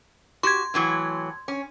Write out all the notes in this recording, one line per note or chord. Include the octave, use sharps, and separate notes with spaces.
F#4 G4 C6 G#6
A2 E3 F#3
C#4